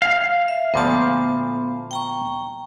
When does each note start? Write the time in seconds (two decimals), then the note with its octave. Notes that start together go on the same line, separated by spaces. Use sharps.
0.02 F5
0.48 E5
0.74 D2 A#2 F3 B3 A5
1.91 G5 A#5 C#6